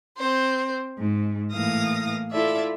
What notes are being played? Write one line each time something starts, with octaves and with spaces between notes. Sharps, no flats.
C4 C5
G#2
A2 E3 A#3 F5 D#6 A#6
E4 F4 A4 D5 E5